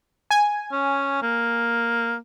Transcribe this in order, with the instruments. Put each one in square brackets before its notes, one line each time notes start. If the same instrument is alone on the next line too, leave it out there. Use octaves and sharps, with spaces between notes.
[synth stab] G#5
[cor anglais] C#4
A#3